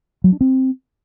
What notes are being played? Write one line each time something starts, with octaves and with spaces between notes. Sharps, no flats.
F#3
D4
C4